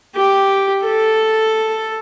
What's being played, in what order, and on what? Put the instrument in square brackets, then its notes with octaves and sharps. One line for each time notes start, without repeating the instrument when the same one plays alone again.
[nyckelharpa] G4
A4